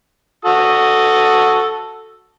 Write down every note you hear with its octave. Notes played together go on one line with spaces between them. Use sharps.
F#4 A4 D#6